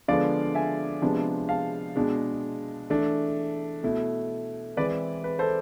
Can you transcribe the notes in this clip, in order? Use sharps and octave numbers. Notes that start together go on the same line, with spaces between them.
D3 F3 G#3 B3 D5 F5
E5 G#5
C3 F3 G#3 B3 D4
F5 A5
B2 G#3 D4
E3 A3 D4
B2 A3 E4
E3 G#3 C4 E4 B4 D5
B4
A4 C5